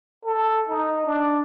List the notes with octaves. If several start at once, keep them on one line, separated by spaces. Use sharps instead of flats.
A4
D#4
D4